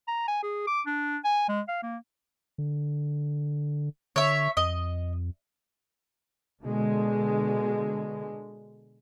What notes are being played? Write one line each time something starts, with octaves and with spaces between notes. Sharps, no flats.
A#5
G#5
G#4
D6
D4
G#5
G#3
F5
A#3
D3
D3 C#5 E5
F2 D#5
B2 D3 G#3